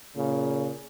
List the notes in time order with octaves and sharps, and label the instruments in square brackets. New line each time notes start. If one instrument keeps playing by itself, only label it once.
[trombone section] A#2 C#3